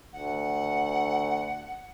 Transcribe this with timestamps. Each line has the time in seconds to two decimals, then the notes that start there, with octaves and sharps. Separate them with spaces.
0.13 D2 F#5